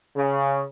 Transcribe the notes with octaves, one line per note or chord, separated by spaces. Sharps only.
C#3